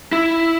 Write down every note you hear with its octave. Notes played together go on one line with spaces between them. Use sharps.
E4